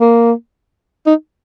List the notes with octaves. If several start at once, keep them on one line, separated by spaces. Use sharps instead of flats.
A#3
D#4